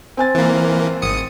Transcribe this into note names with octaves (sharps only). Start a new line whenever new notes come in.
C4 G#5 A6
E3 A#3
G#1 D#6 C#7